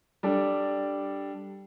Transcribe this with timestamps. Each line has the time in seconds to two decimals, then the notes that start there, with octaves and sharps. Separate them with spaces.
0.23 G3 D4 A4 D5